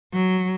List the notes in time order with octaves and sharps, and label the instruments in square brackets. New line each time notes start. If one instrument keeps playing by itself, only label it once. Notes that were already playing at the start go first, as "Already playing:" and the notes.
[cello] F#3